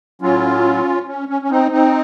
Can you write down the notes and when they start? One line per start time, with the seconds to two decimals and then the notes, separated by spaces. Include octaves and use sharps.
0.22 A2 F#3 C#4 F4
1.07 C#4
1.29 C#4
1.42 C#4
1.50 C4 D#4
1.71 C4 D#4